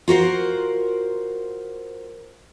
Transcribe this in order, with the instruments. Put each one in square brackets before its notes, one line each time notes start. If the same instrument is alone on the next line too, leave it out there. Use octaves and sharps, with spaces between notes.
[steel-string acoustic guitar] F4 F#4 A#4 C5